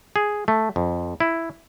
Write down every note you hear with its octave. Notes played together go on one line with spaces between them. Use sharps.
G#4
A3
F2
E4